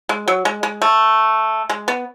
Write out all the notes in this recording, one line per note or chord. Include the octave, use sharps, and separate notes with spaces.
G#3
F#3
G#3
G#3
A3
G#3
B3